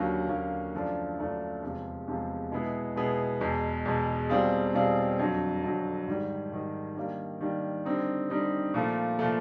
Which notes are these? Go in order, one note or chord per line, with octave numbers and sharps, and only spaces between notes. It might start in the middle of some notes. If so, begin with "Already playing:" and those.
Already playing: D#2 D3 F#3 A#3 C#4
D#2 D3 F#3 A#3 C#4
F#2 D3 F3 A3 D4
F#2 D3 F3 A3 D4
E2 C3 F3 G#3
E2 C3 F3 G#3
B2 G#3 B3 E4 G#4
B2 G#3 B3 E4 G#4
E2 B2 G#3
E2 B2 G#3
B2 G3 C4 F4 G#4
B2 G3 C4 F4 G#4
F2 D3 F#3
F2 D3 F#3
G#2 D#3 G3
G#2 D#3 G3
D#3 G3 A#3 D4
D#3 G3 A#3 D4
D3 G3 C4 D#4
D3 G3 C4 D#4
A#2 F3 A3
A#2 F3 A3